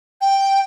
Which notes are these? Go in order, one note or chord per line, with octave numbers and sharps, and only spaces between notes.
G5